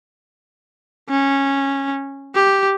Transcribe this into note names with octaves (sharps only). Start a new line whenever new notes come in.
C#4
G4